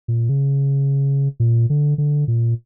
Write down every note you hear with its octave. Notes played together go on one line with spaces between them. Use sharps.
A#2
C#3
A#2
D3
D3
A#2